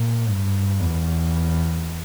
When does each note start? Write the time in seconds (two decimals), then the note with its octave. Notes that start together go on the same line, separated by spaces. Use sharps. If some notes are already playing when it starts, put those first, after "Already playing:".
Already playing: A#2
0.29 G2
0.81 E2